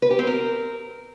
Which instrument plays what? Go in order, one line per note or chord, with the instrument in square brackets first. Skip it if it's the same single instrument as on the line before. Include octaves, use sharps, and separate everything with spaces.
[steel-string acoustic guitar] B4
G4
C4
A#4